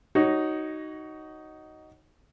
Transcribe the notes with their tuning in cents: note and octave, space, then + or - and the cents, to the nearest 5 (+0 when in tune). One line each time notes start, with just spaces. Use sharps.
D#4 +0 F#4 +20 C#5 -15